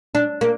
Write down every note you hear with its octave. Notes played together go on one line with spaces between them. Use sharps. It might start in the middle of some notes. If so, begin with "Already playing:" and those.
D4
A#3